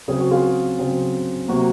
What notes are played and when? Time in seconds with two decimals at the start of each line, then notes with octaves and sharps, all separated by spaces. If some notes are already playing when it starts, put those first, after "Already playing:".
0.08 C#3 F#3 C4 G#4
0.20 F#4
0.31 F4 G#4
0.79 C#3 F#3 C4
1.48 C3 F#3 A#3 F#4